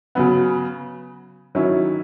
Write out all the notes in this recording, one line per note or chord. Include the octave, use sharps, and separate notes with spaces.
C#3 F#3 B3
D#3 F#3 C#4 E4